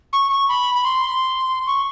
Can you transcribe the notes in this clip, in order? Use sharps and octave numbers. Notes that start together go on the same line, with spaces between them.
C#6
C#6
B5
B5
C6
C#6